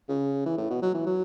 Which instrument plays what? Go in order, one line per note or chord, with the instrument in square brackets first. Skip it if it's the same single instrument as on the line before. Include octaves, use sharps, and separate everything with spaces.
[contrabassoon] C#3
E3
A2
B2
F#3
E3
F#3